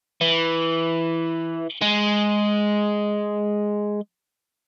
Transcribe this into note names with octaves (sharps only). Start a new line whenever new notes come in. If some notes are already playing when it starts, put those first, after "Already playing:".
E3
G#3